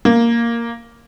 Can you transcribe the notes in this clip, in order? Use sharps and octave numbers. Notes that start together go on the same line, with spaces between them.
A#3